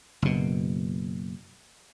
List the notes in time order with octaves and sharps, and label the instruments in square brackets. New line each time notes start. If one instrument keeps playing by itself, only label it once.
[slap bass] F#1 B2